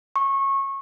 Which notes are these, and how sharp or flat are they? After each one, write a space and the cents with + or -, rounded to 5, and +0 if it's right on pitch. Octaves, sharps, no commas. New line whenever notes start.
C#6 -20